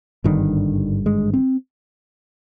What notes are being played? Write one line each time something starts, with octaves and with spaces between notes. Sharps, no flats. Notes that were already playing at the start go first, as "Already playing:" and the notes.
G#1 G2 D3 D#3
G#3
C4